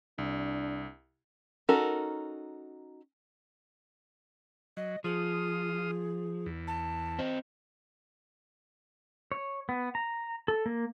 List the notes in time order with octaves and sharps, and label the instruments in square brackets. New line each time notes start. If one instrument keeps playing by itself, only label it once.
[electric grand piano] C2 [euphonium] D4
[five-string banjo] C#4 D#4 F#4 A4 A#4
[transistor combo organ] F#3 [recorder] D#5
[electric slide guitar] F3 [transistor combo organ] F4 D#6 [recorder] G#4
[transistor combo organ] E2
[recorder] A5
[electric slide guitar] C4 C5 D#5
[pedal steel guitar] C#5
B3
A#5
A4
A#3